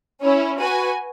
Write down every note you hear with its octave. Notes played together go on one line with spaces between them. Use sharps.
C#4 E4 C#5
F#4 B4 G#5